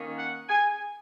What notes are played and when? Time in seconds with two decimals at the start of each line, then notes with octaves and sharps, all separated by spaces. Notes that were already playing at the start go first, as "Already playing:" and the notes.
Already playing: D#3 A#3 C#4
0.18 F#5
0.48 G#5